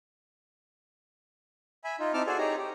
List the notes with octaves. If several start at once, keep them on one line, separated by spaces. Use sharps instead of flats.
E5 G#5 B5
D#4 F4
C4 D#4 E4 A5 D6 F6
F#4 G#4 A4 C5 D5 G#5
D#4 G4 G#4 C#5 A#5
G4